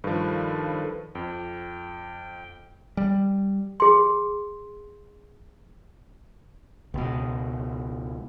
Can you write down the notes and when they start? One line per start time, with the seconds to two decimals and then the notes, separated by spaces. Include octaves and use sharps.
0.04 G2 D#3 F3 A4 B4
1.15 F2 G5
2.97 G3
3.80 G#4 C6
6.94 C#2 B2